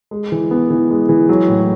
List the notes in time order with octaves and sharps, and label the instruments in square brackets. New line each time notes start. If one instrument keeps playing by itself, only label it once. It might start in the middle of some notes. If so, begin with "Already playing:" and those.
[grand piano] G#3
E3
B3
E3
G#3
E3
F#3
A2